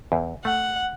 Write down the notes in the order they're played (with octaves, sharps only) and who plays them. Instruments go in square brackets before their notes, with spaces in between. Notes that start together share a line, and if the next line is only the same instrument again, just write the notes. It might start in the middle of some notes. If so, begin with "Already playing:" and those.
[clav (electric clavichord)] E2
[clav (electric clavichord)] A3 [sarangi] F#5